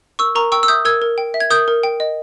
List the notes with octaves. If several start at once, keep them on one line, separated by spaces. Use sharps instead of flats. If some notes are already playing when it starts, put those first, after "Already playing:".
A#4 C#6 E6
A#4 A#5 C#6
G5 C#6 E6
E6
E5 D#6 G6
A#4 E6 G#6
A#4
G5
E5
G#6
A#4 D#6 G6
A#4
G5
D#5